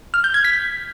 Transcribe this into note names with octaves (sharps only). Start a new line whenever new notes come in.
F6
G6
G#6
B6